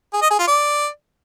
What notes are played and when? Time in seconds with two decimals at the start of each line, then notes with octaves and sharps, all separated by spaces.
0.13 G#4
0.22 D#5
0.30 G#4
0.39 F4
0.47 D5